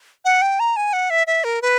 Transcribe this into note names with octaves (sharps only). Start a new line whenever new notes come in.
F#5
G5
A#5
G#5
F#5
E5
E5
A#4
B4